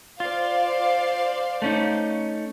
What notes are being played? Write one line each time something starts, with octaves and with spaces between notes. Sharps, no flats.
F4 C5 D5 F5
A3 C#4 D#4